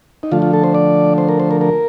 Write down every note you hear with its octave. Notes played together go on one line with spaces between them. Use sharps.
D#4
D3 F3 A3 F4
F4
A4
C5
D5
C5
A#4
C5
A#4
A#4